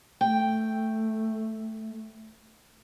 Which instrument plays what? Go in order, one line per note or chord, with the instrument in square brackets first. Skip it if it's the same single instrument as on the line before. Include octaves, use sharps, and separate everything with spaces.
[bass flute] A3 [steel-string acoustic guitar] G5